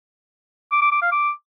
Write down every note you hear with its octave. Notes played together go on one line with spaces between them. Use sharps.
D6
D6
D6
F5
D6